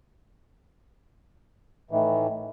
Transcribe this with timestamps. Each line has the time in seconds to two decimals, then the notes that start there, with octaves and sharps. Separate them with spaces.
1.91 A2 D#3 E3